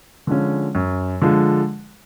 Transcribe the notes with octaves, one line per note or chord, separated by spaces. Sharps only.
D3 F3 G#3 C#4
F#2
D3 F3 G#3